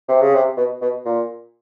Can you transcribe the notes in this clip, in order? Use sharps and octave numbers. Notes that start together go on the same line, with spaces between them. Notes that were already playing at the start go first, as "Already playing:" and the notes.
C3
C#3
C3
B2
B2
A#2